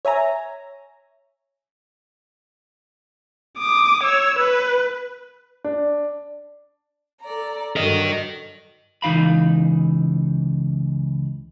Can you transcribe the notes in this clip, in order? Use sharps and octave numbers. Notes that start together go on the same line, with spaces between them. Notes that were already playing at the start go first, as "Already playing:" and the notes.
C#5 E5 G#5 A#5
D6 D#6
C#5 E6
B4
D4
A4 D5 A#5
G2 D3 F#3 A#4 D#5
C#2 E3 D#4 F5 B5